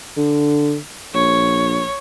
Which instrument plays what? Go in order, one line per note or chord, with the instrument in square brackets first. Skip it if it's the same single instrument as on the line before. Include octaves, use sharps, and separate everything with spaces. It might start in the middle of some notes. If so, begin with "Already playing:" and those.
[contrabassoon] D3
[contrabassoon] A#1 [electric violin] C#5